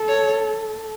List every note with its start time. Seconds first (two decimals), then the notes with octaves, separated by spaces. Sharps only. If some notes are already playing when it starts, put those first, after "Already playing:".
Already playing: A4
0.08 C#5